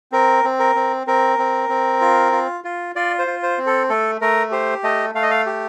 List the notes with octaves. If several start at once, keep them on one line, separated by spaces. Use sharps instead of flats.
C4 A#4
C4
A#4
C4
C4 A#4
C4
C4
F4
F4
F4
F4 D5
C5
F4
C5
C4
A4
A3 A4
A3 A#4
G4 C5
A3 D#5
A3 F5
D#5
F5
G4